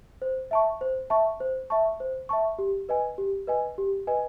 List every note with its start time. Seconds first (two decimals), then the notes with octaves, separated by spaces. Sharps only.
0.22 C5
0.51 E5 A5 C#6
0.81 C5
1.10 E5 A5 C#6
1.40 C5
1.70 E5 A5 C#6
2.00 C5
2.29 E5 A5 C#6
2.59 G4
2.89 B4 D#5 G#5
3.18 G4
3.47 B4 D#5 G#5
3.78 G4
4.07 B4 D#5 G#5